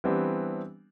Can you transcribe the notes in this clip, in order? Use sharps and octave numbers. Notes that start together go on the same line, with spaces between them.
E3 G3 B3 C4 D4 G4